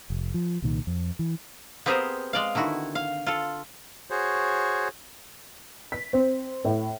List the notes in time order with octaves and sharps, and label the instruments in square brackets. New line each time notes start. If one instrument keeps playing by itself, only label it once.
[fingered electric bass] F1
F3
C2 A#2 D#3
F2
E3
[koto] B3 C4 G4 G#4 A#4 C5
G#3 D5 F5
D3 D#3 E4 F#4
F5
F4 A4
[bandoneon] F#4 G#4 C5 C#5
[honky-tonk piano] B6
C4
A2